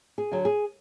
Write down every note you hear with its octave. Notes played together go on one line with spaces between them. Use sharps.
G#4
D3 F#3
G#4